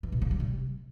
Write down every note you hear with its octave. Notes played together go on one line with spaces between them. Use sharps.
E3
B2
A#3
G3
C3